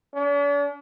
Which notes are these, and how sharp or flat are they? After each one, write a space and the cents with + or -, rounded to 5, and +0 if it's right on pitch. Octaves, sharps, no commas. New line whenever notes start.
D4 -45